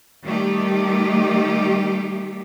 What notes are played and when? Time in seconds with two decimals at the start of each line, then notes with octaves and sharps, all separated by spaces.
0.23 D#3 G3 A3 G4